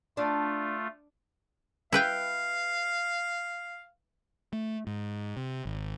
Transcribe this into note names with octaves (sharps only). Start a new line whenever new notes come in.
A3 D4 F4
E4 B4 F5 G5
A3
G#2
C3
G#1